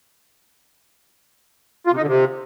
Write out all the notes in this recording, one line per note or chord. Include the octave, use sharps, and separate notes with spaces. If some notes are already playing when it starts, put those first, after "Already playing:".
F4
C3
D#4
D3
C3